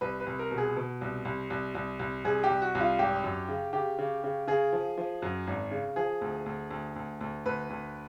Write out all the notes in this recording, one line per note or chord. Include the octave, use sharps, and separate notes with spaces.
C2 B4
B4
C2
A#4
B2
G#4
B2
C2
C2
C2
C2
C2
C2 G#4
G4
C2
F#4
C2
F4
G#1 G4
F#2
C#3
C#3 G4
C#3
C#3
C#3 G#4
F3
F3
F#2
G#1
C#3
F3 G#4
D2
D2
D2
D2
D2
D2 B4
D2